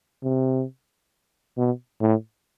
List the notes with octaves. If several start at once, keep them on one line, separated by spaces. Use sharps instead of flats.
C3
B2
A2